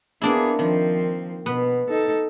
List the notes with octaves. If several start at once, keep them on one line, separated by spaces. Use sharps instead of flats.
A#3 B3 D4 E4 G#4
D#3 F3 C4
B2 B3 B4
D#4 A4